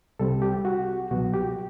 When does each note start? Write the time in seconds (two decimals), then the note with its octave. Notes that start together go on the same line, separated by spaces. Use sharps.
0.19 C2 C3 G3 C4 A4
0.42 G4
0.65 F#4
1.11 C2 B2 F#3 B3 F#4
1.34 G4